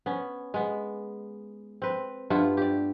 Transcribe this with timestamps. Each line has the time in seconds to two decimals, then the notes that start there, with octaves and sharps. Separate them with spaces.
0.06 B3 C#4
0.54 G#3 B3
1.82 C4 B4
2.30 G2 A3 B3 F4
2.57 G4 D5